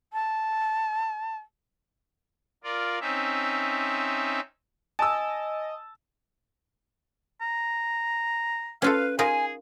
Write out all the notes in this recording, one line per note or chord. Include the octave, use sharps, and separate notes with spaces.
A5
F4 A#4 D5
C4 C#4 D#4 E5
D#5 G#5 A5 E6
A#5
C#4 F4 A4 B4 F5
D#4 F4 G#4 A#4 G#5